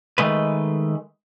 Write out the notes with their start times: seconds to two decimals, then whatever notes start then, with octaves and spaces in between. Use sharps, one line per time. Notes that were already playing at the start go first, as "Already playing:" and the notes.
0.18 D#3 E3 G#3 A3 B4